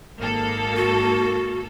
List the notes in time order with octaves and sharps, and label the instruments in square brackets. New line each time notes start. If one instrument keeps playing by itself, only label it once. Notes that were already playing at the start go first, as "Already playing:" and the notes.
[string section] G#1 A#3 A4
[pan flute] F#4